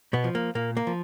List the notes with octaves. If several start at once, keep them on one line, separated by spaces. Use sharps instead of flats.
B2 B3
F3
A#3
A#2 A#3
A#3
F3